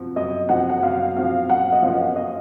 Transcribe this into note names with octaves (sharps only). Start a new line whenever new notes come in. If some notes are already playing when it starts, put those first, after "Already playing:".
Already playing: F#2 F3 C4 F#4
F#2 D#5
F3 C4 F#4 F#5
F#5
F#2 F5
F3 C4 F#4 F5
F#2 F#5
D#5
F3 A#3 C#4 F4 F5
D#5